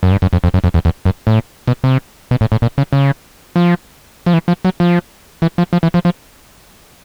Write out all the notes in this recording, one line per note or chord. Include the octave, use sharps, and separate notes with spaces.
F#2
G2
F#2
F2
F2
F#2
F2
E2
E2
F#2
A2
B2
C3
B2
A2
A2
A#2
C#3
C#3
F3
F3
E3
F3
F#3
F3
E3
F3
F3
E3
F3
F3